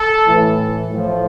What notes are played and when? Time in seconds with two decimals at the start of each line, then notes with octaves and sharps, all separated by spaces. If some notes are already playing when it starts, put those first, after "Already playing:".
Already playing: A4
0.26 A2 E3
0.90 A2 F3